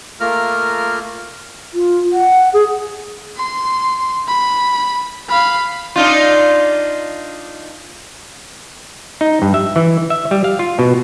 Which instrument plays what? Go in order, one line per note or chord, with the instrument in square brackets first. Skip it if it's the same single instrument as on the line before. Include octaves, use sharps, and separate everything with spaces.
[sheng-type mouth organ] A3 A#3 F4 A#4 A#5 F6
[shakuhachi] F4
F#5
G#4
[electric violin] C6
B5
F5 B5
[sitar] D4 D#4 F4
[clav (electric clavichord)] D#4
G2
E5
E3
E5
G3
F5
F4
B2